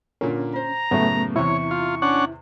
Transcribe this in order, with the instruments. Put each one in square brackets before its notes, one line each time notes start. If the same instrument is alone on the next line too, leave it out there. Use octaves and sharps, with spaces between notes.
[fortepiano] A#2 D3 A#3 [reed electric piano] C#4
[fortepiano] C5 [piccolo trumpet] A#5
[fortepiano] F#2 A2 C#3 [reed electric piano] A3 B3
[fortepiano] E2 C3 [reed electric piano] E4 [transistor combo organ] C#5 [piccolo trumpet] C#6
[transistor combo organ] F4
C#4 D4 F#5